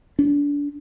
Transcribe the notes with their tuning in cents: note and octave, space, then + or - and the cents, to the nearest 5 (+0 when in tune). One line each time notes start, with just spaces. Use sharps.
D4 -30